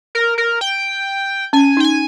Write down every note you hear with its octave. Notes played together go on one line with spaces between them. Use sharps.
A#4
A#4
G5
C#4 G#5
D#4 G5
G#5